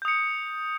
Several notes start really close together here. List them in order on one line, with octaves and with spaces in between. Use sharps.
G6 D#6 C#7